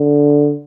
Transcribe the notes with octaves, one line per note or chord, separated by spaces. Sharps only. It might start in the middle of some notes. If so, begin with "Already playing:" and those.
Already playing: D3